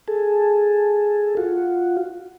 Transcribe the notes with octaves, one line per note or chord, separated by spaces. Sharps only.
G#4 A4
F4 F#4